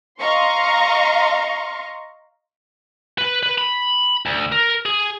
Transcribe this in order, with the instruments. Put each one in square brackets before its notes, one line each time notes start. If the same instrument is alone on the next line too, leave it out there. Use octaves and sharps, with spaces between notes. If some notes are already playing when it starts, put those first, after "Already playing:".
[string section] D#5 F5 A#5 C6 C#6
[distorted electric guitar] B4
B4
B5
D2
A#4
G#4